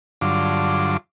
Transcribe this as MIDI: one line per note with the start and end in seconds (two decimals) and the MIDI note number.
0.21 0.97 43
0.21 0.97 50
0.21 0.97 54
0.21 0.97 65
0.21 0.97 86